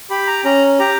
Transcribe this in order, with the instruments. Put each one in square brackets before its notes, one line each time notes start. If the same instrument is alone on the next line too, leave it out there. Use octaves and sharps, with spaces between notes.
[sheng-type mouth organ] G4 B5
A#5
C#4 A#5
G4 A#5